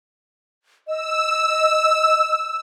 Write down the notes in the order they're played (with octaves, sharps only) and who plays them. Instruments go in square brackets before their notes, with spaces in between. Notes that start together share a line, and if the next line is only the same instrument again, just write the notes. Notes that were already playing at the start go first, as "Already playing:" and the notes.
[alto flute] D#5 [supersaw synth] E6